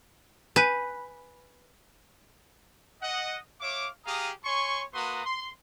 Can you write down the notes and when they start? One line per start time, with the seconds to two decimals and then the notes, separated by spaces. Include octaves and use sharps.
0.56 B4 G#5 G6 D#7
3.03 D#5 F#5
3.61 C#5 E5 F5 D6
4.06 G4 G#4 F5 A#5 D#6
4.45 C#5 G#5 C6 C#6
4.94 A#3 F#4 B4 A#5 C6 D#6
5.25 C6